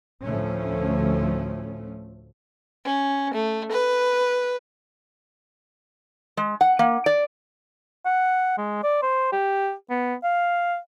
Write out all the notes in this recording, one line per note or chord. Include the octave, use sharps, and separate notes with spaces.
D2 A2 F3 A3 C#4
C#4
A3
B4
G#3
F#5
A#3
D5
F#5
G#3
D5
C5
G4
B3
F5